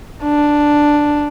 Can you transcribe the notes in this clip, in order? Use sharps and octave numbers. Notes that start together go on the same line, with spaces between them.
D4